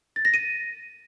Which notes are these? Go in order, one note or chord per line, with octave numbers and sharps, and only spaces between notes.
A6
A#6
D#7